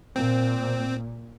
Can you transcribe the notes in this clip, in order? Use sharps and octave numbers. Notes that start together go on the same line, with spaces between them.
A#2 C4